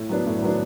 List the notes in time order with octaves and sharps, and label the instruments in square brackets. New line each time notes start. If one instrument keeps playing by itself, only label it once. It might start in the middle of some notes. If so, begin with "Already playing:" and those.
Already playing: [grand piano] A2
F#3 B3 D4
A2
F#3 B3 D4